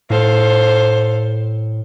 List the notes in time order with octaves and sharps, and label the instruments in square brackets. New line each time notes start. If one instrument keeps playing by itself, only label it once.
[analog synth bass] A2 [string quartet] A4 C5 F5